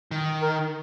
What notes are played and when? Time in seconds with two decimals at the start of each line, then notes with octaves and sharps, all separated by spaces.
0.11 D#3
0.42 A#4